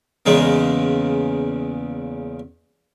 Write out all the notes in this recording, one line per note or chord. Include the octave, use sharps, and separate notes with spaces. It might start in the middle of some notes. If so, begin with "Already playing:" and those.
E2 C#3 G#3 A#3